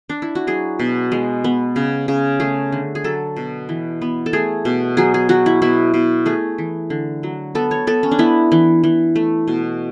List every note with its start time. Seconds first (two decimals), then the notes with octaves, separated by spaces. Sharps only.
0.09 D4
0.22 E4
0.35 F#4
0.47 F#3 G#4
0.79 B2
1.12 G#3
1.44 B3
1.76 C#3
2.08 C#3
2.40 A3 G#4
2.72 D3
2.95 G#4
3.04 F#3 A4
3.36 B2
3.69 E3
4.02 B3
4.26 A4
4.33 A3 G#4
4.65 B2
4.97 F#3 G#4
5.14 G#4
5.29 F#3 F#4
5.46 E4
5.62 B2 E4
5.94 B2
6.26 A3 G#4
6.58 E3
6.90 D3
7.23 F#3
7.55 B3 A4
7.71 C#5
7.87 B3 A4
8.03 C#4
8.11 D4
8.19 B3 E4
8.52 E3
8.84 E3
9.16 A3
9.48 B2